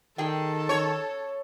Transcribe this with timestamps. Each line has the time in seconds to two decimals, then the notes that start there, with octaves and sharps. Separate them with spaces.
0.18 D#3 G#4 A4 G5
0.69 C#5